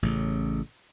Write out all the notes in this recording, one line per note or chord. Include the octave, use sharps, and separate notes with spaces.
A1 A2 C#3